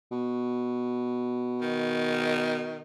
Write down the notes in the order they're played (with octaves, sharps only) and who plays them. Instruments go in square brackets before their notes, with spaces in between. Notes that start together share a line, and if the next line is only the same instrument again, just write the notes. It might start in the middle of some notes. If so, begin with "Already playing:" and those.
[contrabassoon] B2
[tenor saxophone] D#3